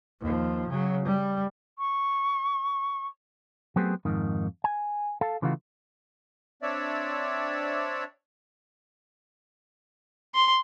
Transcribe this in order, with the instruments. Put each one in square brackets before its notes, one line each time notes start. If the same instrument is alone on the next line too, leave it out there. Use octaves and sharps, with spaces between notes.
[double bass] D#2 F3
C#3 F#3
G3
[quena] C#6
[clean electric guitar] F#3 A3 B3 C4 G4 G#4
F2 G#2 D#3
G#5
A4 F5 A5
C#3 E3 A3 D#4 F4 F#4
[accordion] C4 D4 C#5 D5 E5
[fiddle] C6